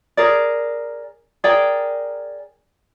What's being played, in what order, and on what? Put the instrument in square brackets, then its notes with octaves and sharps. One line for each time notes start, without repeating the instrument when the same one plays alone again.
[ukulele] G#4 A#4 D5
G#4 A#4 D5 G5